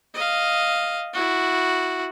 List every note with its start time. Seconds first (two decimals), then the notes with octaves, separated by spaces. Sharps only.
0.14 D#5 F5
1.13 E4 F#4